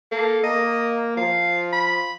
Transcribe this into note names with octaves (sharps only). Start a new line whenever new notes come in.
A#3 A4
A#3 D#5
F3 F5
B5